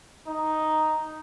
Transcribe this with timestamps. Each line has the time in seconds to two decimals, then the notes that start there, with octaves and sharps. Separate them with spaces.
0.27 D#4